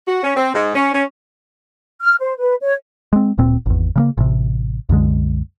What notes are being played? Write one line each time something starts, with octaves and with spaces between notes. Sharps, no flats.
F#4
C#4
C4
G#2
C#4
C#4
F6
C5
B4
C#5
G#3 C4
D1 A#2 C4
G#1 E2
C#3 G3 A#3
A1 C3
C2 F#2 D3 G#3